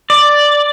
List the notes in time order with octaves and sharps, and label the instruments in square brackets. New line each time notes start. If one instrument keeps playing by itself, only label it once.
[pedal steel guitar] D5